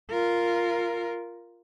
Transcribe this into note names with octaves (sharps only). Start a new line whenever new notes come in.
F4 A#4